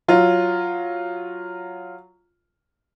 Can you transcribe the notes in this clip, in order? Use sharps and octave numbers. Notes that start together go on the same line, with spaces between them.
F#3 F4